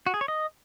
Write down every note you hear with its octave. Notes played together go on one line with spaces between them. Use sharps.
F#4
G#4
C#5
D#5